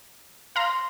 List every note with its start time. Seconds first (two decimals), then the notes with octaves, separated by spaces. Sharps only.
0.56 F5 A#5 C6